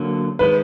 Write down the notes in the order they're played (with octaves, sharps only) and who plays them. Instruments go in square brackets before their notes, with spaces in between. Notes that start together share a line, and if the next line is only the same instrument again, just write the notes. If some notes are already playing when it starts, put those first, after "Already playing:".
Already playing: [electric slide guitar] D3 F#3 A#3
[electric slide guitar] D#3 G#3 [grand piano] B4